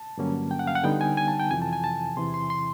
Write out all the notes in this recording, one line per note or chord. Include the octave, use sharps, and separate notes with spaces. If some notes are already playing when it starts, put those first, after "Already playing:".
Already playing: A5
G2 D3 F#3 A#3 C#4
G5
F#5
F5
F#5
D3 G3 B3 D#4 G5
G#5
G#5
A5
G5
F2 C3 E3 G#5
A5
G#5
A5
E2 C3 E3 C6
C6
C6